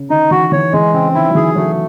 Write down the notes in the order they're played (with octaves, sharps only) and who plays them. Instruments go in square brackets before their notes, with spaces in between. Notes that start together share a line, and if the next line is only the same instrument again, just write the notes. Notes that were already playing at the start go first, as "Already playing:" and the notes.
Already playing: [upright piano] C#3
[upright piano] D#3 [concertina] D#4
[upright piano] E3 [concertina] F#4
[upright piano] E3 [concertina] C#5
[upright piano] E3 [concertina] G#3
[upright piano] C#3 [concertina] C4
[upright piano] D#3 [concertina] E4
[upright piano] F#3
[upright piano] E3 [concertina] G#4
[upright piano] F#3 [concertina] A3